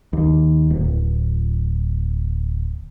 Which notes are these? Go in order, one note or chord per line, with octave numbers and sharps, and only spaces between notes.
D#2
D1